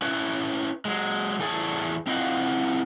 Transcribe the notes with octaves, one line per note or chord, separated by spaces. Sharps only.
C#4 E4 B4 C#5
F#3 G#3
E2 A2 A3 G#4 A4 G#5
C4 E4 F4 D#5 F5 F#5